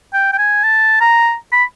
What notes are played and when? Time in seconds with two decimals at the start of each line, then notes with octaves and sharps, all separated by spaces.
0.13 G5
0.33 G5
0.38 G#5
0.63 A5
1.00 A#5
1.52 B5